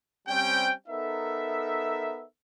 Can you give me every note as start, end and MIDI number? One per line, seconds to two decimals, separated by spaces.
0.28 0.73 55
0.28 0.73 60
0.28 0.73 61
0.28 0.73 79
0.88 2.24 59
0.88 2.24 63
0.88 2.24 69
0.88 2.24 70
0.88 2.24 76